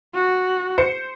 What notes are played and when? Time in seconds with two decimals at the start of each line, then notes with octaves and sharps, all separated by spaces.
0.15 F#4
0.78 C5 C#7